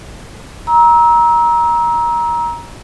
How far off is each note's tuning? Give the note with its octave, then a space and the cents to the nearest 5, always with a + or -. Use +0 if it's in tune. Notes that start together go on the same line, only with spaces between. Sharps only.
A#5 +20 E6 -25